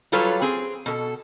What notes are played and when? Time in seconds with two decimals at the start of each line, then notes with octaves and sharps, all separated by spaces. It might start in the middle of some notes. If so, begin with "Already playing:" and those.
0.12 F#3 G3 F4 A4 B4 C#5
0.42 C4 G#4
0.86 B2 A4